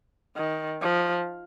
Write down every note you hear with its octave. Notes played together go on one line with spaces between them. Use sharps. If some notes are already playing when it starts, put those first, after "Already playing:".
D#3
F3